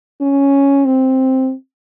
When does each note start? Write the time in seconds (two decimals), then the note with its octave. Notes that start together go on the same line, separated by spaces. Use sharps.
0.21 C#4
0.85 C4